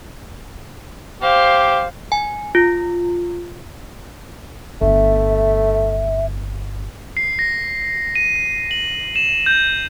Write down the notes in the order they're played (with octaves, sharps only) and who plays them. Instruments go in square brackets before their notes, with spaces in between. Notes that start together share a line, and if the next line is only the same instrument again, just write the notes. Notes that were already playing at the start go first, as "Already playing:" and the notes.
[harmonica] G4 [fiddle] C5 F5
[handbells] G#5
F4
[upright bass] G1 [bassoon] A3 [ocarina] E5
[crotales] C7
A#6
D#7
F#7
E7
G6